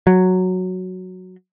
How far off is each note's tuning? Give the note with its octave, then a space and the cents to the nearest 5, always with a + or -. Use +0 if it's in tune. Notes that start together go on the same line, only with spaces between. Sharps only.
F#3 -5